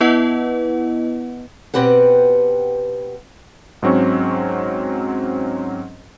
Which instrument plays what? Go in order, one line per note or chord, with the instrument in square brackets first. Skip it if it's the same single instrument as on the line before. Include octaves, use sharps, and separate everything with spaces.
[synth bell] B3 E4 B4 D#5 F#5
[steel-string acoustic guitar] B2 C4 G4 B4 F#5
[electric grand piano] G#2 F#3 C4 C#4 C#6